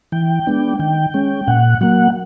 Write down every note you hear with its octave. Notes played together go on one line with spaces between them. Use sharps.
E3 G5
G#3 B3 D4
D#3 G5
G#3 C#4
A#2 F#5
F#3 A#3 F#5